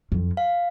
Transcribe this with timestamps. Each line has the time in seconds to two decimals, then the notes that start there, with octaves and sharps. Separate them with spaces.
0.12 F2
0.37 F5